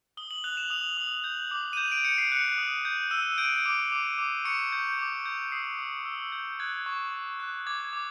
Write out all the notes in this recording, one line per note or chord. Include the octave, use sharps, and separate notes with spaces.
D#6 G7
F#7
F#6 F7
E7
D#6 F7
D#6
G6
D6
D#7
G6 E7
D7
G6 C#7
C7
F#6 C#7
D#6
G6
E6 D#7
G6 D7
D6
D6
D6
C#6 C#7
G6
D6
G6
D#6 C7
D#6
E6
G6
F#6 G#6
C#6
C#6
F#6
D6 G#6
D6